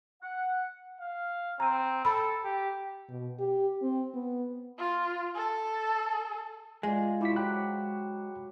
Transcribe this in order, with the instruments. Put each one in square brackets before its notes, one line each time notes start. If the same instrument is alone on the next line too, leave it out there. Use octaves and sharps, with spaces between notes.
[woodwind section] F#5
[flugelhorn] F5
[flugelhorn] C4 [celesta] A#5 D#7
[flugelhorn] A4 [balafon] B5
[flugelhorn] G4
[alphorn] B2
G4
C4
B3
[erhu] F4
A4
[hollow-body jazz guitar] G#3 [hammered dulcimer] F4 [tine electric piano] D5 G#5
[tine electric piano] E4 B6 [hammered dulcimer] F#4 G4 C5
[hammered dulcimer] F#3 [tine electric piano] G5 B5 F#6